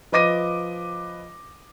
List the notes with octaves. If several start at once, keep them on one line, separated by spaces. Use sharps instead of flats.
F3 B4 D#5 D6 A#6 D#7